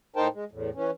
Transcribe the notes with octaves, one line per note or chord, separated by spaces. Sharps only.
A2 D#4 A#4 C5 G5 A5
G#3
E2 A2
E3 C#4